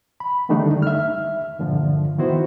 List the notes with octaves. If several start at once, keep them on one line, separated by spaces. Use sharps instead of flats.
B5
D3 D#3 G3 A3 D4 D#4
E5 F6
G2 A#2 D3 F3
D#3 B3 E4 F#4 C5